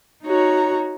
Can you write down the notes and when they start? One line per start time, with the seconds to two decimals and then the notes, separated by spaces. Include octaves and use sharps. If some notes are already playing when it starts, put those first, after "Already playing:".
0.25 D#4 F#4 C#5 A#5